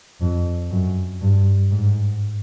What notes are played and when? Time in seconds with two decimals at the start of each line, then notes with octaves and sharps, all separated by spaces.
0.21 F2
0.71 F#2
1.21 G2
1.70 G#2